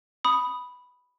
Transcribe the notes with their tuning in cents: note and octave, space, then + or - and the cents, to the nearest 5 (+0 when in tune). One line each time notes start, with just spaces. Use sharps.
B5 +0 D#6 +0